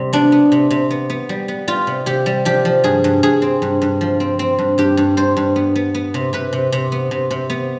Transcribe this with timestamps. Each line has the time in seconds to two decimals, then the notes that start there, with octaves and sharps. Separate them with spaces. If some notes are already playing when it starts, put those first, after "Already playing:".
Already playing: C3 G3
0.13 B3 D4
0.32 B3
0.52 C3
0.71 C3
0.91 B3
1.10 B3
1.29 G3
1.48 B3
1.68 G3 F4
1.87 C3
2.06 C3 G4
2.26 G3
2.45 F3 G4
2.65 F3
2.84 G2 G#4
3.04 G2
3.23 G2 G#4
3.42 C4
3.62 G2
3.82 G2
4.01 F3
4.20 C4
4.39 C4
4.59 G2
4.78 G2 G4
4.97 G2
5.17 G2 C5
5.37 G2
5.56 B3
5.76 B3
5.95 B3
6.14 C3
6.33 C3 B4
6.53 C3
6.72 C3
6.92 B3
7.11 C3
7.31 C3
7.50 B3